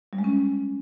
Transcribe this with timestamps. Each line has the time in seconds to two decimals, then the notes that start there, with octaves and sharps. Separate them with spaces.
0.13 G3
0.18 G#3
0.24 C#4